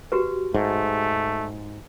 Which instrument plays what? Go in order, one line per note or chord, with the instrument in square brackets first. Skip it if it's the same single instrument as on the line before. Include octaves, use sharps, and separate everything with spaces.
[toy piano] F#4 G4 B4
[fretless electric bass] G#2 [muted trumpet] A3